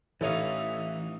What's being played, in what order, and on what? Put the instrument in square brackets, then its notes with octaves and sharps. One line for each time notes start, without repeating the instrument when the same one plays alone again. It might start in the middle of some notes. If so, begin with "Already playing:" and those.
[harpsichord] A1 D#4 F5 [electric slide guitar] E3 [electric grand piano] E4 A4 C#5 [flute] E5